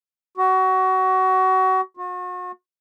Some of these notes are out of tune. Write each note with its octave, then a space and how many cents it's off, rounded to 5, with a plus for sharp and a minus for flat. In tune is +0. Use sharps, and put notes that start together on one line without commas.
F#4 +25
F#4 -40